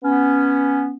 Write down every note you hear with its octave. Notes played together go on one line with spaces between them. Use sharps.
B3 C#4